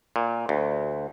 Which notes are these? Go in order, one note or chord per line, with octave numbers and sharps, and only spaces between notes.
A#2
D2